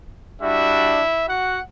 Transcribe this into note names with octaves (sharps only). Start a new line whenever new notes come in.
G3 D4 E4 F#4 E5
F#4 F#5